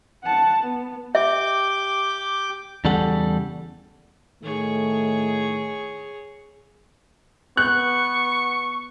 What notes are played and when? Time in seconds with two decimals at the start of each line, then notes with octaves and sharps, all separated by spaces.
0.24 F#5 A5
0.60 B3
1.15 G4 E5 D6 G6
2.85 E2 C#3 G3 G4 A4 F#5
4.43 A2 D#3 A3 G#4 C#5
7.57 B3 C#6 F#6